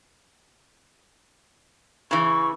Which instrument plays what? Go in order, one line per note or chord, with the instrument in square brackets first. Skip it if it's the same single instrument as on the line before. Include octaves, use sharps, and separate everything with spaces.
[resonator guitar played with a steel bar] C#3 E3 [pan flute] C#6